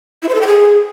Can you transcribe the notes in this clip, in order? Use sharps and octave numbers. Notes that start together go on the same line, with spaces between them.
E4
C5
A4
G5
G#4